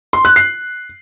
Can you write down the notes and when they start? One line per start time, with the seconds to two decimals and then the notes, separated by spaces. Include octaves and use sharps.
0.13 C6
0.25 F#6
0.36 C7